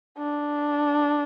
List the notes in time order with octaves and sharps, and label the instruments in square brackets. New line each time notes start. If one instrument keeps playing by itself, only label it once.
[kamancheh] D4